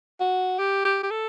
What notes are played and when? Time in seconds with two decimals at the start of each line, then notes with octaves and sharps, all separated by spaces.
0.20 F#4
0.59 G4
0.85 G4
1.03 G4
1.11 A4